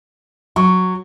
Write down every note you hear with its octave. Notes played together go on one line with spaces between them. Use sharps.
F#3 C#6